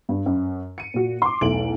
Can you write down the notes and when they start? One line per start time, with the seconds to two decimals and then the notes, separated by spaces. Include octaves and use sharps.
0.09 G2
0.26 F#2
0.78 C#7 D#7
0.94 A#2 F#4
1.22 C6 D6
1.41 B1 E2 A3 D7 F#7